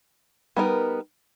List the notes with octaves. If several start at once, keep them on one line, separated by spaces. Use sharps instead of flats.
G3 B3 D#4 F#4 A#4